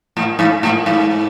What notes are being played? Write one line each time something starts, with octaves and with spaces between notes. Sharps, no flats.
A2
G#2
A2
G#2